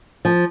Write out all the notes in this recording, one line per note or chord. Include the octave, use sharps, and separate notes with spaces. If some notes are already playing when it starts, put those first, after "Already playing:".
F3